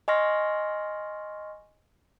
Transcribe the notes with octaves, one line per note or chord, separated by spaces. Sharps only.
D#5 G#5 C6 C#6 F6 A#6